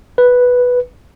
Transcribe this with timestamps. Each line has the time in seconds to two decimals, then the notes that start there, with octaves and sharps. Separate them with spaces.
0.18 B4